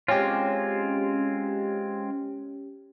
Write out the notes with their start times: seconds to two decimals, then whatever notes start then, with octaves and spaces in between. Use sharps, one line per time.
0.08 G#3 C4 C#4 F4 G4